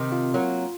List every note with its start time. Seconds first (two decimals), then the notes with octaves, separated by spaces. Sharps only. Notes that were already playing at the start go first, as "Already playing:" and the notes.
Already playing: C3 D#3
0.12 F4
0.34 F#3 A#3